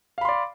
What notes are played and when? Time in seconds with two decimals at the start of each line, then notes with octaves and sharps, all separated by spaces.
0.18 F5
0.21 B5
0.25 C6
0.29 D5